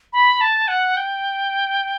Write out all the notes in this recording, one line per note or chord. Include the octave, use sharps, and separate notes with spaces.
B5
A5
F#5
G5